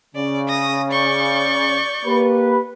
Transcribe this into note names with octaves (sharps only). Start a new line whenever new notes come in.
C#3 D5
D#6 A#6
D5 C#6 G6
A#3 G4 B4